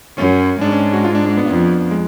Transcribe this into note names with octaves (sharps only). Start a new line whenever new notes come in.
F#2 C#4
G#2 D4
C#4
F#4
F4
D4
D4
B3
F2
G#3